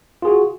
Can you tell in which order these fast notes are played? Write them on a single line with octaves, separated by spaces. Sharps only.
F4 G#4 F#4